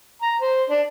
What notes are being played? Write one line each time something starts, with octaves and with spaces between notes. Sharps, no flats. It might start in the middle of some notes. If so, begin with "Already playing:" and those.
A#5
C5
D4